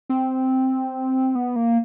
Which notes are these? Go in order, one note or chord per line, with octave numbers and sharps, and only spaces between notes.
C4
B3
A#3